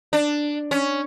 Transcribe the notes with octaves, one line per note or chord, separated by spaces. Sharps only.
D4
C#4